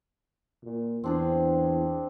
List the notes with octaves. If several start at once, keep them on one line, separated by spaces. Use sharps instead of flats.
A#2
E2 C4 D4 G#4